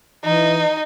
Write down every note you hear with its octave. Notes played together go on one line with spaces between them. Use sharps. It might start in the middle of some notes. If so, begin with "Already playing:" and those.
E3 D#4